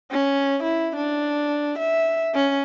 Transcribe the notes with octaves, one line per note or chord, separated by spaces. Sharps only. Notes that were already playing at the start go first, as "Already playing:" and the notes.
C#4
E4
D4
E5
C#4